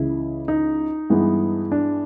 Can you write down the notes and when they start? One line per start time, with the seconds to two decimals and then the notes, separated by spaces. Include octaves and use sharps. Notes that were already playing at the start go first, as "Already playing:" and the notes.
Already playing: C#2 C#3 E3 E4
0.48 D#4
1.10 G2 E3 G#3 B3
1.72 D4